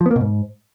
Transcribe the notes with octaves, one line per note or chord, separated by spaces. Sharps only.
F3
B3
A#3
B2
G#2